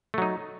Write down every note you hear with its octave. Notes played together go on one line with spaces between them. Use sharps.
F#3 A3 D#4